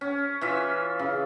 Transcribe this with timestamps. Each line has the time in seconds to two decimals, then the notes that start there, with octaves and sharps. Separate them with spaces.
0.01 C#4
0.41 E3 F4 E5
0.99 C#3